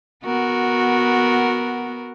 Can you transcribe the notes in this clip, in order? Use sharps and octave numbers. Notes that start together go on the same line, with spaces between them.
B3 F#4 A#4